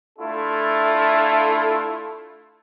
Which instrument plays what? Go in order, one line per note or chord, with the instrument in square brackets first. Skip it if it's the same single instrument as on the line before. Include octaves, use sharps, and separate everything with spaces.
[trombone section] A3 D4 E4 F4 A4